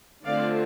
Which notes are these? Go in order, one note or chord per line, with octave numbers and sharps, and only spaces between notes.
D3 A3 C4 F4 D5 F5